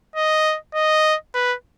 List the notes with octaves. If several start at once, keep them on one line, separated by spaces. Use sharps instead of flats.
D#5
D#5
B4